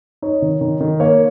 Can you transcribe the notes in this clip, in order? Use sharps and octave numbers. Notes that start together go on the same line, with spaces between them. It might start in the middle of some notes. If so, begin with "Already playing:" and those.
D#4 C#5
D#3
D#3
D#3
A#3 C#5